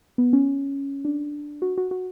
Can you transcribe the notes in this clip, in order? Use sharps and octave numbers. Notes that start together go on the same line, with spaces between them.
B3
C#4
D4
F#4
F#4
F#4